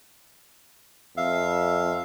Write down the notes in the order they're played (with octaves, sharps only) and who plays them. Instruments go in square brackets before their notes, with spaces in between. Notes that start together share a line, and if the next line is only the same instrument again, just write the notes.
[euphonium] F2 [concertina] E5 F5